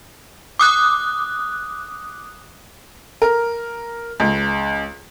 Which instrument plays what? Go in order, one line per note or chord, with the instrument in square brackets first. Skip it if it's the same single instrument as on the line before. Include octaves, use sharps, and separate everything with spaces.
[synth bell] D6 D#6 F#6
[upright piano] A#4
C#2